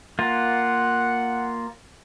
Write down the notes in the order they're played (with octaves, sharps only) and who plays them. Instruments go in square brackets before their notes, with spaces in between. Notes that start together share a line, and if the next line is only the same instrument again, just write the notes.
[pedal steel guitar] A#3 F4 [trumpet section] F#5